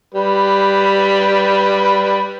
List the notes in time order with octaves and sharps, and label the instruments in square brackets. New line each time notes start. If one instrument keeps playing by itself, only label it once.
[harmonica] G3 B4